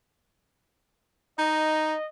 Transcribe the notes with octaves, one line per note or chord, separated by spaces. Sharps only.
D#4 D#5